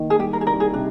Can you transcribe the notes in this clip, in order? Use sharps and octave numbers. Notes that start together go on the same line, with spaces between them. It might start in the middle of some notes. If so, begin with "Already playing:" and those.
Already playing: D#3 A#3
G#4
G3 G4
A#4
G#4
C2 A#4
G#4
C3 D4